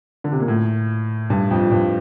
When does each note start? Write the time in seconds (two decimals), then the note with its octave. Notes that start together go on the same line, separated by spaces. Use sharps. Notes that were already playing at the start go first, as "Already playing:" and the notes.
0.24 D3
0.32 C3
0.40 A#2
0.48 A2
1.30 G2
1.51 F2
1.71 G2